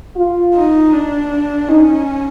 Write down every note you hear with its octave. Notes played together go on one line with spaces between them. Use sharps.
F4
D#4
D4
C#4 D#4